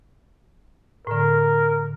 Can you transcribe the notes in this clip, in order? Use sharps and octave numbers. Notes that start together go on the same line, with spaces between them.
A2 D3 A#4